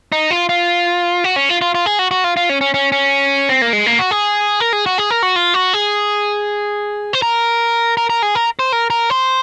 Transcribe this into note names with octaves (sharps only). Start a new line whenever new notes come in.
D#4
F4
F4
F#4
C#4
F4
F4
F4
G#4
F#4
F#4
F4
F4
C#4
C#4
C#4
C#4
C4
A#3
G#3
A#3
F#4
G#4
A#4
G#4
F#4
G#4
A#4
F#4
F4
F#4
G#4
C5
A#4
A#4
A#4
G#4
A#4
C5
A#4
A#4
C5